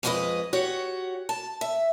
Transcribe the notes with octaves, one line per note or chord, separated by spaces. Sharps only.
F2 G#3 B3 F#4 B4 D#5
F#4 G4 C#5
A5
E5